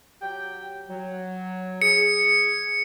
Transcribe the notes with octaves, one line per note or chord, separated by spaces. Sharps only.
F#3 G4 G5
F#3
G#4 C#7